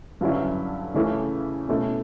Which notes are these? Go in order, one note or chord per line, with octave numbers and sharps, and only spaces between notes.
G2 D3 F#3 C#4 E4
C#3 E3 A3 C#4 E4
B2 A3 C#4 E4